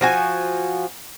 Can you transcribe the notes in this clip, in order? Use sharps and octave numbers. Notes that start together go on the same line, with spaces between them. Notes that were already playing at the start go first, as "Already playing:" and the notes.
F3 F#4 G#5